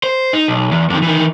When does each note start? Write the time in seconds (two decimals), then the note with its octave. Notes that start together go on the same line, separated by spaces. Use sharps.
0.04 C5
0.33 D#4
0.48 B1
0.71 E2
0.90 F2 D#3
1.02 D#3 E3